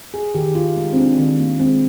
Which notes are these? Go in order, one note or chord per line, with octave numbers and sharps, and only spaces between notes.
G#4
D#3 G4
F4
G#3 D#4
C4
D4
D#3 C4
A#3
G#3 C4